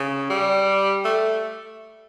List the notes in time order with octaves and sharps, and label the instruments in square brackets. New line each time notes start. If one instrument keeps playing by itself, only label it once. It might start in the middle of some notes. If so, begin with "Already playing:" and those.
Already playing: [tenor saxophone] C#3
G3
A3